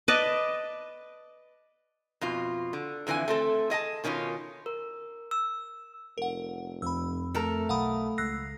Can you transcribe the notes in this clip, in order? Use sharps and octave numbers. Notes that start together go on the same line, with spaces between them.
B4 D5 D#5 A5
F2 B2 F4
D3
F2 D3 E3 D4 G#5
A3 C4 A4
G#4 D#5 G5 A5
B2 D#3 C#4 D4 F4
A#4
E6
F1 A#4 F#5
F2 B5 E6
A3 A4 A#4
B1 F5 F#5 B5 D#6
C#2 E6 F#6 A#6 C7